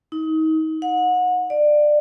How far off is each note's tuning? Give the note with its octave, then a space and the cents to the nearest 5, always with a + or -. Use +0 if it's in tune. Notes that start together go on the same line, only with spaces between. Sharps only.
D#4 +30
F#5 -30
D5 +20